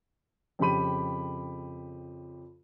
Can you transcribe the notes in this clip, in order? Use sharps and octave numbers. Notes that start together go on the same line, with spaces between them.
F2 C#3 G4 B5 D#7